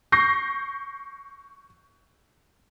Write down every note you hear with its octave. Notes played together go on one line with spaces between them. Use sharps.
C#6 G6 A#6 C7